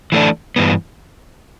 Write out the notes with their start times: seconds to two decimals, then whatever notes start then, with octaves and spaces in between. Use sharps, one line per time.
0.12 E3 A3 D4
0.56 G2 E3 B3